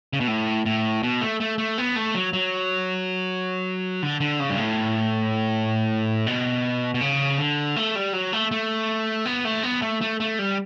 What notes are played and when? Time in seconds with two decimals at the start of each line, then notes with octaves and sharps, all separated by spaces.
0.13 C#3
0.20 B2
0.27 A2
0.65 A2
1.03 B2
1.21 A3
1.40 A3
1.58 A3
1.78 B3
1.96 A3
2.15 F#3
2.33 F#3
4.03 D3
4.20 D3
4.40 C#3
4.50 G2
4.58 A2
6.27 B2
6.94 B2
7.01 C#3
7.38 D3
7.76 A3
7.95 G3
8.13 F#3
8.33 A3
8.51 A3
9.26 B3
9.45 A3
9.63 B3
9.82 A3
10.01 A3
10.20 A3
10.39 G3